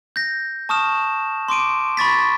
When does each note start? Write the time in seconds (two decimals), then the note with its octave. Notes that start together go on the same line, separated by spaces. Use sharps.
0.16 G6 A#6
0.69 A5 C#6 D#6 F6 E7
1.48 C6 D6 D7 D#7
1.97 B5 C#6 A6 B6